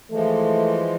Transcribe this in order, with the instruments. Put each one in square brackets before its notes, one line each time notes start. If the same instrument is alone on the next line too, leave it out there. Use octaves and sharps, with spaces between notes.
[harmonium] E3 F3 G#3 [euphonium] A3